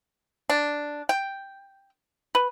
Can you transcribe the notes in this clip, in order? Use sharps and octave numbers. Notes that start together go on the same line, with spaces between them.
D4
G5
B4